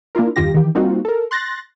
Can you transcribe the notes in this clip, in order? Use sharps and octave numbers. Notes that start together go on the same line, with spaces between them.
A#3 D4 E4 F4 A#4
E2 G2 D#3 F4 G4 A#6
D#3 E3 G4
G3 A#3 C4 D#4 F4 F#4
A4 A#4
C6 F#6 A6 A#6